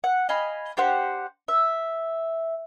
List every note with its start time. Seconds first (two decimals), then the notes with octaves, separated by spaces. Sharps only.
0.04 F#5
0.29 D#5 F5 G#5 B5
0.77 D4 G4 C5 F#5
1.48 E5